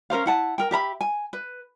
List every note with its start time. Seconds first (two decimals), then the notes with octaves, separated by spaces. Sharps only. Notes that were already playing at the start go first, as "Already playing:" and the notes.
0.10 C#4 A#4 C5 F5
0.26 E4 F#5 A5
0.58 A#4 G5
0.71 G4 E5 A#5 B5
1.01 G#5
1.33 B4